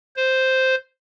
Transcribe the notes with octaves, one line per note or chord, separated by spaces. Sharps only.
C5